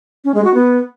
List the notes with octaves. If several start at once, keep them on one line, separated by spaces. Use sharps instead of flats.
C#4
G#3
F#4
B3